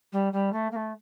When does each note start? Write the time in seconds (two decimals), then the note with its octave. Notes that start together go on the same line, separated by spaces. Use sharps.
0.12 G3
0.33 G3
0.52 A3
0.72 A#3
0.76 A3